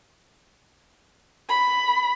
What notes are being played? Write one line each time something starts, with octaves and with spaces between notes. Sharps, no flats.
B5